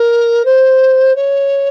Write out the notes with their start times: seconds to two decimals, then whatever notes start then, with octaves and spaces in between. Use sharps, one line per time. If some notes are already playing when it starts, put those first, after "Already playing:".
Already playing: A#4
0.45 C5
1.15 C#5